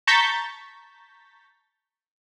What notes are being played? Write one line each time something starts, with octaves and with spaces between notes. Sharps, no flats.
A5 A#5 C#6 G6 A6 B6